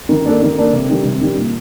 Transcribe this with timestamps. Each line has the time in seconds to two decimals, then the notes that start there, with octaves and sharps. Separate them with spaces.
0.09 D#3
0.26 A#3 D4 A4 D5
0.42 D#3
0.57 A#3 D4 A4 D5
0.73 C3
0.90 D#3 G3 D4 G4
1.05 C3
1.21 D#3 G3 D4 G4
1.38 A#2